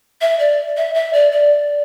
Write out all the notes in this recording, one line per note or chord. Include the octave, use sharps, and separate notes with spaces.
E5
D5
E5
E5
D5
D5